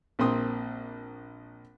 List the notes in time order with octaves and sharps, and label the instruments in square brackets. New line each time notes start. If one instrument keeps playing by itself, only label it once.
[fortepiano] A#1 A#3 C4 C6 D#6